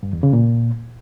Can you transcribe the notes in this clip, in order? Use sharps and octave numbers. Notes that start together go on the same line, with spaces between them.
G2
E2
C#3
A#2